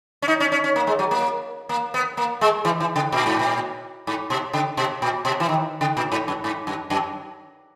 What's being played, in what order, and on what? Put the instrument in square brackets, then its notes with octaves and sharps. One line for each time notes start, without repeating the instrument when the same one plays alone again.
[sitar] C#4
D#4
C#4
C#4
C#4
A#3
G#3
F#3
A#3
A#3
B3
A#3
G#3
E3
E3
C#3
A#2
G#2
A#2
G#2
B2
C#3
B2
A#2
B2
E3
D#3
C#3
A#2
G#2
F#2
G#2
F#2
F#2